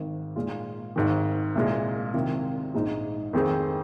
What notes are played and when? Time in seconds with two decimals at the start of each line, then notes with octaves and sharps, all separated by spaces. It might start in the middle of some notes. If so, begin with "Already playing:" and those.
Already playing: G#1 G#2 D#3
0.36 A#2 G#3 F4
0.96 G#1 G#2 D#3
1.55 C2 A#2 G#3
2.14 C2 C3 D#3 C4 F4
2.74 A#1 G#2 G#3 D#4
3.33 F2 D#3 C4 G#4 C5